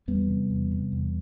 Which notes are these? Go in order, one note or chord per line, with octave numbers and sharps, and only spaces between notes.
E2 G3 B3
C3
E2
C3
E2